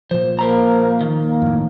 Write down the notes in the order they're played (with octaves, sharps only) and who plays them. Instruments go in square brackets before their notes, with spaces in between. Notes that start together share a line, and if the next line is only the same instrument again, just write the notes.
[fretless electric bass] A#2 F3 [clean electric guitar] C5
[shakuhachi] A#3 [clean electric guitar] A#4 C5 A#5
[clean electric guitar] D#3
[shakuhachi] A#3
[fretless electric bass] F2 A2